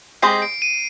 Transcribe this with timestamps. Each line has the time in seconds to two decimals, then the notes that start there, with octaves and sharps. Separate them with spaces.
0.22 G#3 C4 G4 C5 D#5 C7
0.42 D7
0.62 D#7